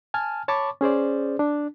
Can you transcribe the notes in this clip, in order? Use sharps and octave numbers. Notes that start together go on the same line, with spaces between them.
G#5 A5 F6
C#5 A5 B5 C#6 D6
C#4 G#4 C5 D5
D4